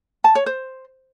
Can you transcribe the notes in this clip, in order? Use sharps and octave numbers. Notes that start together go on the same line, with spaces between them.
A5
C#5
C5